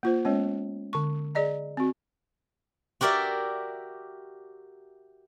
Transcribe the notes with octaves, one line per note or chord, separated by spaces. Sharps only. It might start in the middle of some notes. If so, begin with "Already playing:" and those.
A#3 F4 C5
G#3 B3 C#4 C#5
D3 C#6
G#4 D5 D#5 A#5
C4 F#4
F#4 G4 A#4 D5 E5